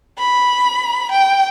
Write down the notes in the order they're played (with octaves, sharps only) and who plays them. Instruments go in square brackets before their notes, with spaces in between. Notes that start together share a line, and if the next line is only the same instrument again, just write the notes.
[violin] B5
G5